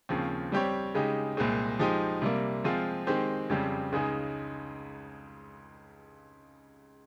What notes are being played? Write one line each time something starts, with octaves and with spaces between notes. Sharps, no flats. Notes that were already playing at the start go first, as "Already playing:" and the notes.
D#2 C#3 F3 C4
G3 C4 G4 C#5
C#3 G#3 D#4 G4
C2 A#2 G#3 C4
F3 G#3 D#4 G4 C5
C3 G3 A#3
F3 G#3 C4 F4
D#3 G#3 C4 G4 C5
F2 C#3 G3 C4 G4
C#2 C#3 G#3 D#4 G#4